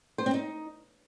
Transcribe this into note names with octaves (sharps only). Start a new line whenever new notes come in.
C5
C4
D#4